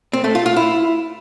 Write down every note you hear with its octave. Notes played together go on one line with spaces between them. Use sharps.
C4
A3
F4
F4
E4